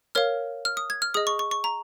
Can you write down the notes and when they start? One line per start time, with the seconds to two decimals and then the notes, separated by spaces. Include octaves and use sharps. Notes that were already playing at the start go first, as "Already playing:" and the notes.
0.15 A#4 C#5 F5 F6
0.65 F6
0.77 D#6
0.90 G#6
1.02 F6
1.14 G#4 D#5 D#6
1.27 C#6
1.39 C#6
1.51 C#6
1.64 A#5